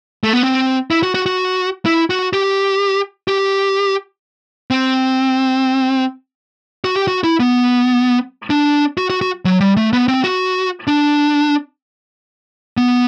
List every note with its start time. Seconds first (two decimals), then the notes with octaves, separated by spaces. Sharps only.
0.24 A3
0.33 B3
0.43 C4
0.91 E4
1.03 F#4
1.14 F#4
1.26 F#4
1.86 E4
2.10 F#4
2.33 G4
3.28 G4
4.71 C4
6.84 F#4
6.96 G4
7.08 F#4
7.24 E4
7.40 B3
8.50 D4
8.98 F#4
9.10 F#4
9.21 F#4
9.45 F#3
9.61 G3
9.77 A3
9.93 B3
10.08 C4
10.24 F#4
10.87 D4
12.77 B3